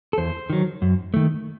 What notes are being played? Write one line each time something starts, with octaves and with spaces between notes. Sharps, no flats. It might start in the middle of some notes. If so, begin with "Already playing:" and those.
A4
E2 C5
D#3 F#3
F#2
D#3 A3